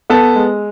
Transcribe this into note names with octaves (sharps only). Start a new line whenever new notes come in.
B3 A4
G#3